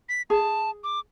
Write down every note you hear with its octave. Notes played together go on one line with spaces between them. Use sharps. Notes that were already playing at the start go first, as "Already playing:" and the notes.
B6
G#4 A5
D6